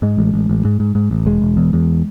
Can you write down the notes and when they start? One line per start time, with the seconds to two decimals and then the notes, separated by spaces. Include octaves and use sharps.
0.02 G#2 G#3
0.18 A1
0.34 A1
0.49 A1
0.65 G#2
0.80 G#2
0.95 G#2
1.11 A1
1.26 E1 G#3
1.42 E1
1.57 E2
1.73 E2